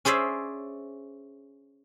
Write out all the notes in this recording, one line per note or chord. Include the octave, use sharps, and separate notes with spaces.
C#4 G#4 C5 D5 E5